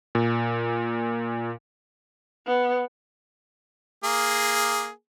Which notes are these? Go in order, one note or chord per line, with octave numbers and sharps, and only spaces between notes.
A#2
B3
A#3 G#4